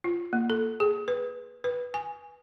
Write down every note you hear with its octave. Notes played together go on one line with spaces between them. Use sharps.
F4
A#3
A4
G#4
B4
B4
G#5